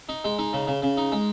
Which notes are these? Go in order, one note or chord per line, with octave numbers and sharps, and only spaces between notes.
D#4
G#3
D#4
C#3
C#3
C#3
D#4
G#3